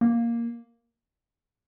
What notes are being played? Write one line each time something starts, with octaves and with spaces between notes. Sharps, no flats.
A#3